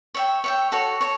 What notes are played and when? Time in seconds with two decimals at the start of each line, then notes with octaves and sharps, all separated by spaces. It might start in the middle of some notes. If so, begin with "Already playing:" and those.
0.14 C#5 E5 G5
0.44 C#5 E5 G5
0.72 F#4 A4 C#5
1.01 A4 C#5